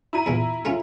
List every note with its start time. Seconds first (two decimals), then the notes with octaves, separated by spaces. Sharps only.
0.13 E4 A#5 D#7
0.26 E2 A#2 E3
0.65 A3 C#4 F4